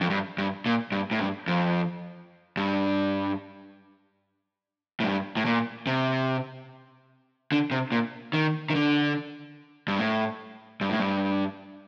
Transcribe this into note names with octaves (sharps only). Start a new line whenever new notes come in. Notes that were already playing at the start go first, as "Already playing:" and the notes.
F2
G2
G2
A#2
G2
A2
G2
F2
G2
A2
G2
A2
A#2
C3
D3
C3
A#2
D#3
D#3
D3
G2
A2
G2
A2
G2